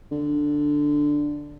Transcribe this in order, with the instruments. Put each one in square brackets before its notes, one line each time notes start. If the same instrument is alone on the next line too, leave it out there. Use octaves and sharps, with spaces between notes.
[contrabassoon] D3